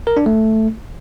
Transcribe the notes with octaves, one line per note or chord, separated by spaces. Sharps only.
A#4
D4
A3